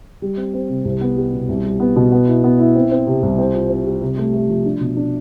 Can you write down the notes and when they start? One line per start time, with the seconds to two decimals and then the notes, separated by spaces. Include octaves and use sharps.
0.22 G3
0.37 C4
0.54 C4
0.69 C3
0.85 C2
1.01 B3
1.17 G3
1.33 B2
1.49 C2
1.65 G3
1.80 B3
1.96 B2
2.12 B3
2.28 E4
2.44 B3
2.59 E4
2.75 C4
2.92 C4
3.07 C3
3.23 C2
3.38 C4
3.54 F4
3.70 C4
3.86 G3
4.01 C3
4.17 A3
4.34 A3
4.50 F3
4.66 D4
4.81 B2
4.97 D4